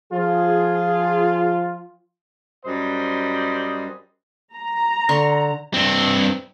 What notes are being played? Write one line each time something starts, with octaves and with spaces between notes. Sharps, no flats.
F3 F4 G#4
F#2 G3 C5 D#5
A#5
D3 C6 C#6
G2 C4